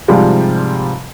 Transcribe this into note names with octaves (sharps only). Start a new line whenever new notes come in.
G#2 C3 F3 G3 G#3 F4